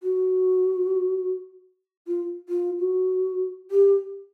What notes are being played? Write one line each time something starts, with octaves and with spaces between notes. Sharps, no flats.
F#4
F4
F4
F#4
G4